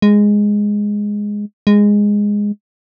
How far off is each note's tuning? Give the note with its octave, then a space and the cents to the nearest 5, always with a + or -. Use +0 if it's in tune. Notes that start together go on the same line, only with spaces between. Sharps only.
G#3 -5
G#3 -10